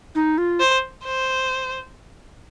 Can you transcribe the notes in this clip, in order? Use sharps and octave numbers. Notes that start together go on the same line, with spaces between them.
D#4
F4
C5
C5